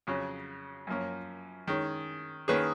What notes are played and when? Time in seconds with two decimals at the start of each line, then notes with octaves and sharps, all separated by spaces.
0.07 F2 C#3 F#3 C#4
0.87 F#2 F3 A#3 C#4
1.68 D#3 G#3 C#4
2.48 D#3 A#3 C#4 G#4 B4